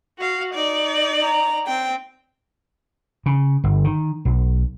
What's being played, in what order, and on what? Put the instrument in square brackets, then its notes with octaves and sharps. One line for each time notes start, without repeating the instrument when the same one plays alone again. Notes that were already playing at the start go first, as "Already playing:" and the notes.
[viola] F#4 F5
D#4 D5
[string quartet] A#5
[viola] C4 [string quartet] G5
[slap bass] C#3
G1
D#3
B1